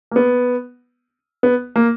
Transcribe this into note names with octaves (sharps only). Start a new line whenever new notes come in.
A#3
B3
B3
A#3